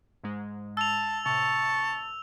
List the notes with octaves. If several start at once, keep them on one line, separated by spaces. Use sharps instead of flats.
G#2 G#3
A5 E6 F7
A2 C3 A5 C#6